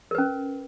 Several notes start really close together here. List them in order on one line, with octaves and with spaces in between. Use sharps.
A#4 B4 C#4